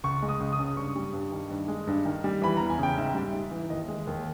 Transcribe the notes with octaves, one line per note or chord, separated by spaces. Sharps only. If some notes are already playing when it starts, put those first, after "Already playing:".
C#2 C#6
G#3
D#6
C#2
D#6
C#3
G2 C#6
G3
G2
D#3
G2
G#3
G2
D#3
G3
E3 B5
E2 A#5
G#5
C#3 G5
G#2 E5
G3
G#2
E3
D#2 D#5
G#3
D#2